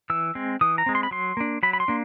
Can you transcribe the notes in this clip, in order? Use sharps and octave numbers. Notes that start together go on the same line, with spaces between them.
E3 E6
G#3 C4
E3 D#6
A#5
G#3 C4
C6
B5
F#3 C6
A#3 D4
F#3 B5
B5
C6
A#3 D4